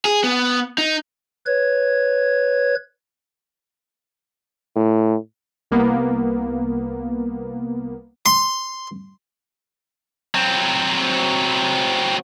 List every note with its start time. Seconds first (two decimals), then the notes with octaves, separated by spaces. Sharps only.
0.05 G#4
0.24 B3
0.78 D#4
1.46 B4 C#5 G#6
4.76 A2
5.71 C2 A#3 B3
8.26 C6
10.35 F#3 C4